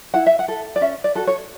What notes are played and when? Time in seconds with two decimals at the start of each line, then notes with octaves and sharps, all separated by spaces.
0.14 E4 F#5
0.27 E5
0.39 F#5
0.48 A4
0.76 D5
0.81 C#4 E5
1.04 D5
1.15 F#4 A4
1.27 C#5